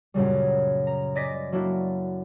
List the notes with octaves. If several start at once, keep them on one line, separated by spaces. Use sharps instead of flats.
F#2 A#2 C#3 G3
A#5
D5 D#5 G#5 A#6 B6
F#3 A#3 D4 E4 F#4